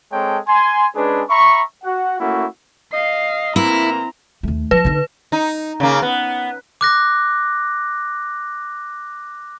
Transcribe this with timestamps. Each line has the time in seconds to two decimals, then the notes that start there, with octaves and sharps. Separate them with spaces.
0.12 G#3 C4 A4 C#5 G5 A5
0.48 G#5 C6
0.95 G#3 C#4 D4 G#4 B4
1.29 E5 A#5 B5 C#6
1.84 F#4 F#5
2.20 A3 A#3 C#4 E4 F#4
2.93 D#5 F5 C7
3.56 A2 E3 A#3 C4 E4 A#5
4.43 D#2 A3
4.71 F3 B4
4.85 D3 D#4
5.32 D#4
5.80 C#3 A#3
6.02 B3
6.81 D6 F#6 A#6